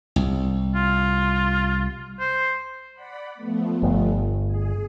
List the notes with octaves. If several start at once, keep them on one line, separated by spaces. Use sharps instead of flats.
C2
F4
C5
D5 F#5 B5
F3 A3 B3
G1
G#4